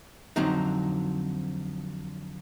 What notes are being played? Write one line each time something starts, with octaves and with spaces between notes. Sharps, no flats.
F2 D3 F#3 C4 D#4